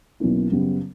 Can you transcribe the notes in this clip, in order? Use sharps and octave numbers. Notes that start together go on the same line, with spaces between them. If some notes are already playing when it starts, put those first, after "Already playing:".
B1 B2 A#3 C#4 E4
F#2 C#3 G3 B3